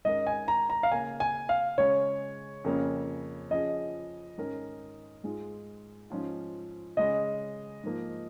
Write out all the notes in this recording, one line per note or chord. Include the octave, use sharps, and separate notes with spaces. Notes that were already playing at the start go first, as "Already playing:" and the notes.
G#2 D#3 G#3 C#4 A#4 D#5
G#5
A#5
A#5
F5
C#3 A#3 C#4 G#5
G#5
F5
C#3 G#3 C#4 C#5
F2 C#3 A#3 C#4 A#4
F3 C#4 G#4 D#5
G#2 D#3 C#4 A#4
G#2 G#3 F4 G#4
G#2 F3 C#4 F4
C#3 G#3 C#4 D#5
G#2 F3 A#3